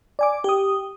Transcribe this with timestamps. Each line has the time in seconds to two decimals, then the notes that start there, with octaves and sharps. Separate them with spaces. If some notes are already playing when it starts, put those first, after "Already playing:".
0.19 D5 G#5 D6
0.44 G4 D#6